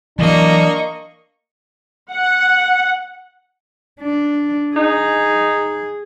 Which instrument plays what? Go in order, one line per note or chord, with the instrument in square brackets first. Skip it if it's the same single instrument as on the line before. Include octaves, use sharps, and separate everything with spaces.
[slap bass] E3 F#3 [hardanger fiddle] A#3 A#5 [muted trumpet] D4 [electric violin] D#5 C#6
[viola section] F#5
[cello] D4
[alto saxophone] D#4 [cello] G#4